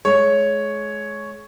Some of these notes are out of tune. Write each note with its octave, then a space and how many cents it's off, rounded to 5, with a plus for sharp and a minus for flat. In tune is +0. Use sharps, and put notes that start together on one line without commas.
G#3 +35 C#5 +0